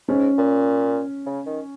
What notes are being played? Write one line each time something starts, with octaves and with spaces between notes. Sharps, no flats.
G#2 C#4
A#2
C#3
D#3